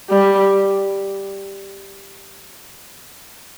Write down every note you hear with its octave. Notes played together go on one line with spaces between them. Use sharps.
G3